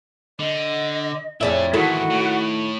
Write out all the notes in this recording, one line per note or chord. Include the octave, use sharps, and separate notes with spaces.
D3 D#5
F2 E4 G#4 D5 E5 A5
G#2 D#3 E3 E4 F#4 A4
A2